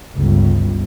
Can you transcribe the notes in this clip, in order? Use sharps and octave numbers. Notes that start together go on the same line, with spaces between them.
G1 C#2